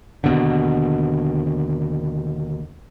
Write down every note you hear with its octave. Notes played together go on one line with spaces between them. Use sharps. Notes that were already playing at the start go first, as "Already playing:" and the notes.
D#2 B2 D3